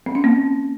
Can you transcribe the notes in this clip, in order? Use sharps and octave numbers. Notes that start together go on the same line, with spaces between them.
C4
C#4
A#3